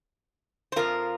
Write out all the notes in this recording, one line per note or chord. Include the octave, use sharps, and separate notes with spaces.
C5
F2 F3 F4 A#4